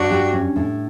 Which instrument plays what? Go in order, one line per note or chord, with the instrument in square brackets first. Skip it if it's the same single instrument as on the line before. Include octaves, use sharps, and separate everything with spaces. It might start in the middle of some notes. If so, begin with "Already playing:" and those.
Already playing: [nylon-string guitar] G2 [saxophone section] D4 F#4
[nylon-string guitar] G4
C#4
A2